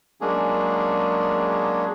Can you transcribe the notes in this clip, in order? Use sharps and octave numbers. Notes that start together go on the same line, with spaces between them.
F#3 G#3 A#3 C#4 D4 G#4